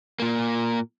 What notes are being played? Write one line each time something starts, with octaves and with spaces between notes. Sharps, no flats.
A#2 A#3